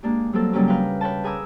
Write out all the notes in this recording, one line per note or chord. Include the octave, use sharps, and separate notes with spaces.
G#3 A#3 D4 G4
F#3 G3 A#3 C4 A4 A#4
C#3 F#3 G3 A#3 C#4 G4
A#4 B4 F5 G5
B4 C#5 G5 A5
G#4 A#4 G#5 B5 D6 E6